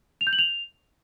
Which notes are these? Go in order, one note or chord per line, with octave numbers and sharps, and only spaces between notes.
F7
G6
F#7
F7